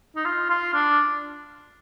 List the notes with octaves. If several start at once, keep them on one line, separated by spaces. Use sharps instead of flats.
D#4
F4
F4
D4